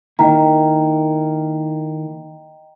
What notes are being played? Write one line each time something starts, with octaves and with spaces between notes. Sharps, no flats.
D#3 A#3 E4 D#5 G5 A#5